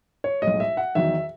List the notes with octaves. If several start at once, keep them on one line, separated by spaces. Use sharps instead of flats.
C#5
B1 A2 G#3 D#5
E5
F#5
E2 D#3 F#3 E5